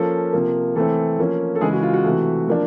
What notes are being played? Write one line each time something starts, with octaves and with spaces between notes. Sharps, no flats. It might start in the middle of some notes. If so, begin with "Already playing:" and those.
Already playing: F3 A#3 C#4 A4
C3 F3 A#3
E3 A3 C4 A4
F3 A#3 C#4
A4
C#3 E3 G#3 G#4
F#4
F4
F#4
C3 E3 A3
F3 A#3 D4